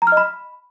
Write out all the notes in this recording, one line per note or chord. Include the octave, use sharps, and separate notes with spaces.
A#5
F6
D#5
B5